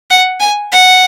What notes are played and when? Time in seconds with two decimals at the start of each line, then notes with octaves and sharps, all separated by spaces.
0.10 F#5
0.40 G#5
0.72 F#5